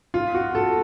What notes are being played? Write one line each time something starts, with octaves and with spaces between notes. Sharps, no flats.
F4
F#4
A4